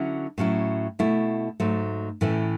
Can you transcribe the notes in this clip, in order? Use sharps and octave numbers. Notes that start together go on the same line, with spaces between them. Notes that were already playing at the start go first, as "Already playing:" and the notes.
Already playing: D3 F#3 C#4 E4
A2 F#3 C#4 E4
B2 A3 E4
G#2 F#3 A3
A2 E3 A3 C#4 E4